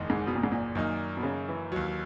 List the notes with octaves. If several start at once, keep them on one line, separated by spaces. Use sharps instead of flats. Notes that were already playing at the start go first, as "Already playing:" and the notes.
Already playing: F#1 E2 D#3 G#3 D#4
G#2
B2
A#2
G#2
A#2
F#2 D#3 A#3 D#4
B2
C#3
E3
D#2 D#3 F#3